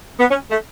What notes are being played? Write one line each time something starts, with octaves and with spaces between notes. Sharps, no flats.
B3
C#4
A3